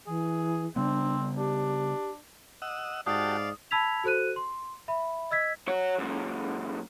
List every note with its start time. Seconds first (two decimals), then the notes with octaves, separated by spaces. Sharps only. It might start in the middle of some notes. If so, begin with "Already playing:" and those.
0.07 E3 G#4
0.76 C#3 G3 B3 C4 D4
1.37 D4 G4
2.62 D#5 F#5 E6
3.06 G#2 F#4 G4 D5 F5 A5 D#6
3.71 A5 B5 E6 G#6 B6 F7
4.04 F#4 A4 C5 F#6 D#7
4.36 C6
4.88 E5 B5
5.31 D#5 E6 G#6 B6
5.68 F#4 C#5
5.98 F#2 A#2